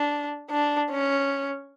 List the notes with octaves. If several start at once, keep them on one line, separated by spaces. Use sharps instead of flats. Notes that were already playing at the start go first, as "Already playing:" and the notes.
Already playing: D4
D4
C#4